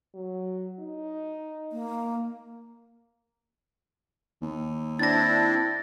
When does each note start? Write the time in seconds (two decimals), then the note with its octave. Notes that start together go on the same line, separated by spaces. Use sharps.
0.15 F#3
0.80 D#4
1.72 A#3
4.42 D#2
4.99 C4 D4 E4 A6 A#6